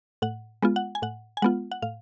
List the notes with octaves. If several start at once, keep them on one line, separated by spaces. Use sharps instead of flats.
A2 F#5
G#3 B3 F4
F#5
G#5
A2 F#5
G#5
G#3 B3 F4 F#5
F#5
A2 F5